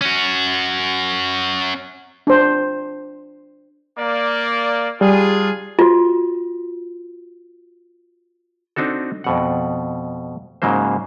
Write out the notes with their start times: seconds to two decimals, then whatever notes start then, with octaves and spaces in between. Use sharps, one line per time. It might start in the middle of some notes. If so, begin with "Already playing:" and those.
0.01 C#4 F#4
2.27 D4 C5
3.99 A#3 D5
5.01 G3 D4 F4 G#4
5.79 F4 F#4
8.76 C4 D4 D#4 F#4 A4
9.24 F2 B2 F#5
10.62 G#2 C#3 F#3 A#3 C5